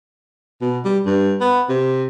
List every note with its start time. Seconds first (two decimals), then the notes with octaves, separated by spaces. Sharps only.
0.61 B2
0.85 G3
1.06 G2
1.41 B3
1.69 C3